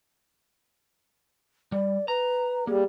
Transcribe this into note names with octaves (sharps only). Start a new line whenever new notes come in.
G3 D5
B4 A#5
G3 A#3 G#4